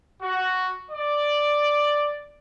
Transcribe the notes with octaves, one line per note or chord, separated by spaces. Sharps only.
F#4
D5